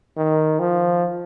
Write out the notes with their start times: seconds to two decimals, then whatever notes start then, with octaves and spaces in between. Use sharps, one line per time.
0.17 D#3
0.60 F3